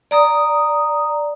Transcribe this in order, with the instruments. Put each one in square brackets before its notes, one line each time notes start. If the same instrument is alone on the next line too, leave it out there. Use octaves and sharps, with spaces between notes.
[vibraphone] D5 A#5 D#6